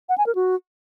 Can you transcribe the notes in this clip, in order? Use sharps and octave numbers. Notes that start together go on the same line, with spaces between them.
F#5
G#5
A#4
F#4